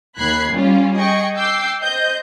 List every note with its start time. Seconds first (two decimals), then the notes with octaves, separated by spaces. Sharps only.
0.17 D#2 B5 F#6 G#6 C7
0.53 G3 C#4 F4
0.97 G#4 D#5 G5 C#6
1.34 G5 D6 E6 G6 C7
1.81 C5 D#5 G6